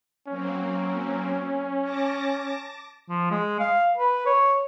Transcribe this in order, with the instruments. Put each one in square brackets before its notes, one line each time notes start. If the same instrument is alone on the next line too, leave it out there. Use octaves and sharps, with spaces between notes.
[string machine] F#3 A#3 C4 [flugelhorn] C#4
[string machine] A5 D6 A#6
[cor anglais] F3
G#3
F5
B4
C#5